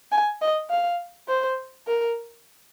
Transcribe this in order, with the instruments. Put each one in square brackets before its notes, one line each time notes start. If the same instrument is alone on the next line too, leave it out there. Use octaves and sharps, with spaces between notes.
[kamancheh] G#5
D#5
F5
C5
A#4